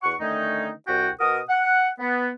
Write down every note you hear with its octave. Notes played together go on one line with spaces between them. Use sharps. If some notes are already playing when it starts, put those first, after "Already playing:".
E2 F#4 F#5 C#6
D3 D#3 A3 C#4 D#4
C2 F#4 G5
B2 F#4 A#4 D#6
F#5
B3